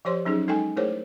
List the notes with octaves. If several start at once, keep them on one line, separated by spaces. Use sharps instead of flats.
F3 G4 C5 C#5 C6
F#3 C#4 D#4 G#4
G#3 D#4 A4 D#5 G5 G#5
A3 E4 G#4 A#4 C5 C#5